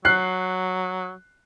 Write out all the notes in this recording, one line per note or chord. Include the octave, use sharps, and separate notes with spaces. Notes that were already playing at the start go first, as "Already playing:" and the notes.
F#3 F#6 C7